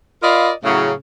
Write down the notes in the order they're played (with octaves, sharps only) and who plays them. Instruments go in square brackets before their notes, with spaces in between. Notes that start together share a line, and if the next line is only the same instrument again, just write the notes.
[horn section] F4 A#4 D5 D#5 F5 B5
A2 C#3 F#3